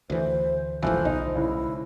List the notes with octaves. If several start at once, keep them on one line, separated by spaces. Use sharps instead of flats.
D2 E3 C5
E1 A1 D2 E3 F3 C5
B1 D#4
C#2 E4